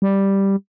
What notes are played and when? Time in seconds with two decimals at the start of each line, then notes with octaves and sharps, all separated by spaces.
0.02 G3